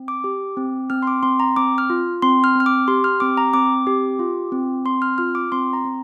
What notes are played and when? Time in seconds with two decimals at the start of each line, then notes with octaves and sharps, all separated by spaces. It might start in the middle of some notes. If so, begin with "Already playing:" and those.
Already playing: C4
0.08 D6
0.24 G4
0.57 C4
0.90 C4 F6
1.02 C6
1.07 D6
1.23 C4 C6
1.40 A#5
1.56 C4 D6
1.78 F6
1.90 F4
2.22 C4 C6
2.44 F6
2.56 C4 F6
2.66 D6
2.88 G4 C6
3.04 F6
3.20 C4 D6
3.37 A#5
3.54 C4 D6
3.87 G4
4.19 F4
4.52 C4
4.85 C4 C6
5.02 F6
5.18 F4 F6
5.35 D6
5.52 C4 C6
5.73 A#5
5.85 C4